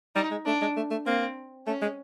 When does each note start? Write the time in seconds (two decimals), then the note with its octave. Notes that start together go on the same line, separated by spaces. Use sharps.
0.16 G3 D#4
0.31 G#3
0.46 A3 D4
0.61 G#3
0.77 A3
0.91 A3
1.06 A#3 C4
1.67 A3 C#4
1.82 G#3